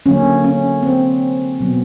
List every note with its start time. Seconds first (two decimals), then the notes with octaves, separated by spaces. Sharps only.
0.06 D3 F#3 A#3 C#4
0.44 C#4
0.83 C4
1.60 B2 F#3 B3